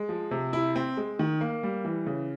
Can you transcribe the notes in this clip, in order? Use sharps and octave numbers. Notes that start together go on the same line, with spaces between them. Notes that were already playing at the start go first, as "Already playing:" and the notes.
Already playing: G#3
F3
C3
E4
C4
G#3
D#3
A#3
G3
E3
C#3